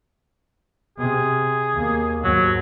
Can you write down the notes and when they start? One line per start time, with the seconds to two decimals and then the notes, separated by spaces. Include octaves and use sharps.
0.98 C3 G#4
1.74 D#2 A#3
2.24 D#2 G#2 F#3